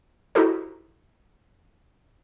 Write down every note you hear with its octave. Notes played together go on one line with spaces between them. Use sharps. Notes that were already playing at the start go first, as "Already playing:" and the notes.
D#4 E4 F#4 G4 A4 C5